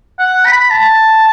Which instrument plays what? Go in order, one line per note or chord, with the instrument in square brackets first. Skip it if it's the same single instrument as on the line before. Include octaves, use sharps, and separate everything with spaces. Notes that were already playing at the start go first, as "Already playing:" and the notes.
[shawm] F#5
B5
A5